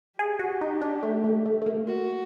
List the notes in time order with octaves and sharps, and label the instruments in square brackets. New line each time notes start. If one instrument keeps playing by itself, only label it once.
[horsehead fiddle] G4 [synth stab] G#4
[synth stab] F#4
D#4
D4
A3
A3
A3
A3
A#3
[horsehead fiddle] F#4